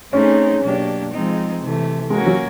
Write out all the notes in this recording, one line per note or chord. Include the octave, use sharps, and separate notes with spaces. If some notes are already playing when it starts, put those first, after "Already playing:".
A3 C4 C#4 D#4 G#4
B2 F#3 A#3 D4 G4
F3 G#3 C4 D#4
C3 E3 A3
G#3 A#3 C#4 F#4 A#4
F#3